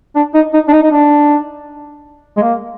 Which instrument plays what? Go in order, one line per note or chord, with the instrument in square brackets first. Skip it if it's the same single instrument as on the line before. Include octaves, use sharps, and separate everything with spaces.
[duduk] D4
D#4
D#4
D4
D#4
D#4
D4
G#3
A#3